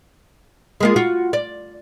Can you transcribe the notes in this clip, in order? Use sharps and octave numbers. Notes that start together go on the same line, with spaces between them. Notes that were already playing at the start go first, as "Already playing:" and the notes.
G#3 A#3 F4
F4 F#4
D5